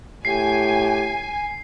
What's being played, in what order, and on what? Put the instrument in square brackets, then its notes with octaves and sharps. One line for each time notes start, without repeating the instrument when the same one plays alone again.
[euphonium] A2 [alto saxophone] G4 [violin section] G#5 [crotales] C7